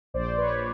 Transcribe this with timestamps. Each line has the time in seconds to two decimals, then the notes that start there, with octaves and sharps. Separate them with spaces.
0.14 A#1 C5 D5
0.37 B4 C#5